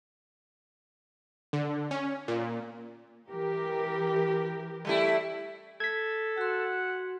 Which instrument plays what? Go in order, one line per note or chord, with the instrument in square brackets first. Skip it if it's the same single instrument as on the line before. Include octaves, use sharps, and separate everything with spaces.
[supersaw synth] D3
C#4
A#2
[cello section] E3 G4 A#4
[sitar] G3 A3 E4
[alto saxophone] A4 [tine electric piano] G#6 B6
[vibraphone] F#4 C6 [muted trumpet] F#5